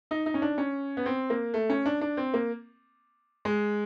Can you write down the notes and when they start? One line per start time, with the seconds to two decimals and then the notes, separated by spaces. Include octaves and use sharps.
0.11 D#4
0.26 D#4
0.34 C#4
0.42 D4
0.58 C#4
0.97 B3
1.06 C4
1.30 A#3
1.54 A3
1.70 C#4
1.86 D4
2.01 D4
2.17 C4
2.34 A#3
3.45 G#3